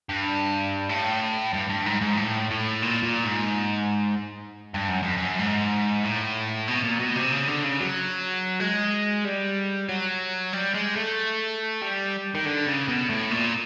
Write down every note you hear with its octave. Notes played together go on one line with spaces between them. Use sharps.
G2
A2
G2
G2
G#2
G#2
A2
A2
A#2
A#2
G#2
G2
F#2
F2
F#2
G#2
A2
B2
A#2
B2
C3
C#3
D3
C#3
F#3
G#3
G3
F#3
G3
G#3
A3
G3
D#3
D3
C#3
B2
A2
A#2